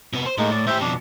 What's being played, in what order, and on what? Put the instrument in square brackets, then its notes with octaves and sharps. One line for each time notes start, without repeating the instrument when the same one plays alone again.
[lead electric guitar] C3 B3
C5
[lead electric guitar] A2 [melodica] G#3 A#3 D#4
[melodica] D5
[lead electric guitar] A2 G4 [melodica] C5 E5
[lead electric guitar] F2 B2 [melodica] D4